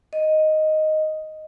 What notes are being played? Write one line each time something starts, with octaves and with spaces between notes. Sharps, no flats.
D#5